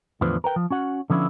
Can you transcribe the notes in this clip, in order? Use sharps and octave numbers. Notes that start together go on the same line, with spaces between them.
E2 A2 D3 F3 B4 C5
A#4 B4 G5
F3
C#4 F#4 F#5
D3 F3 B3 C#4 E4